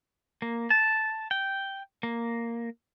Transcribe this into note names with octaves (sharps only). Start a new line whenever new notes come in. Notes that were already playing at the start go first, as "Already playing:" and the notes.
A#3
A5
G5
A#3